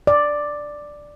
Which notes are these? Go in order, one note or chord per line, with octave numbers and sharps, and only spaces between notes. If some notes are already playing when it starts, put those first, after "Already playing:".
D5